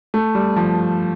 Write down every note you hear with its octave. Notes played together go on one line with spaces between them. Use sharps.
A3
G3
F3